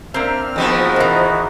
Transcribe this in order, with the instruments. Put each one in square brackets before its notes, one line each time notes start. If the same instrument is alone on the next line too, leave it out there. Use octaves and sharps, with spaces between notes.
[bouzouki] A#3 C4 [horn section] D4 D5 E5 [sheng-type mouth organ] F6
[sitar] F2 F3 B3 [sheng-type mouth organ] D#4 F#4 [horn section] G#4 A#4
[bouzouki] D#3 E3